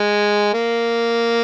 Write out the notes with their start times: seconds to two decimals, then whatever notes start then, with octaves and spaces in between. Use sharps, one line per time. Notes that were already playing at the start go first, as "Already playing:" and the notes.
Already playing: G#3
0.53 A#3